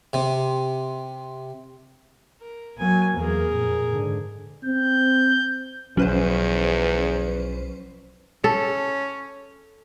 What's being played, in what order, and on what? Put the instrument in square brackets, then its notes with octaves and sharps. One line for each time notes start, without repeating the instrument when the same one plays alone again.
[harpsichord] C3
[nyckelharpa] A#4
[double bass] F#3 A#3 [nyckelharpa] G#5
[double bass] E2 A#3 [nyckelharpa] G#4 A#4
[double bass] F2 A#2
G#2 D3
[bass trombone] C4 [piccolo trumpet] G6
[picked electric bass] B1 F3 [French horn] E2 [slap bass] F#3 [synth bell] C#4 B4 C5
[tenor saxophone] C#4 [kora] A4